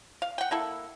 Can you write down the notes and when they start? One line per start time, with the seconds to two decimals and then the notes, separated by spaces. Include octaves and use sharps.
0.22 F5
0.38 F#5 G5
0.51 A#3 E4 A4